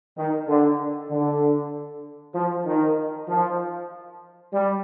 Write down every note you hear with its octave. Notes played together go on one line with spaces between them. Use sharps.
D#3
D3
D3
F3
D#3
F3
G3